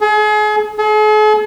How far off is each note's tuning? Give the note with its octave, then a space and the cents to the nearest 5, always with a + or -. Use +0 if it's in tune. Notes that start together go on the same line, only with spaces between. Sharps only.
G#4 +35
G#4 +45